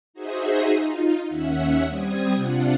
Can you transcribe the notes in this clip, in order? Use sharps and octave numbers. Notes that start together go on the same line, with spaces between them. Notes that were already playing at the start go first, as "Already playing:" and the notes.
D#4 F#4 G#4 C5 E5 D#6
D#4 F4
D#2 C#4 E5 F#5
G3 C4 D#6 G#6
C3 D4 F4 F#5